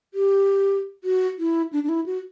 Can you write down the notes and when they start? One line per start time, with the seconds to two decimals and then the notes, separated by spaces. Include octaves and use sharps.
0.14 G4
1.04 F#4
1.39 E4
1.73 D4
1.83 D4
1.89 E4
2.06 F#4